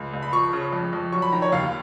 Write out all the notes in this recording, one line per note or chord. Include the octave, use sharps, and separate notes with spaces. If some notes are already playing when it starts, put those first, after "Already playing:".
Already playing: C#2
C#2
B5
F3 C#6
C#3
F2
F2
F#3 C#6
B5
D#3 A#5
C#5
D#2 F5